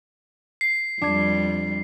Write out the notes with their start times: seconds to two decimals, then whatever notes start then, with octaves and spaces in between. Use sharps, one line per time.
0.61 C7
1.02 F2 G3 D4 G#6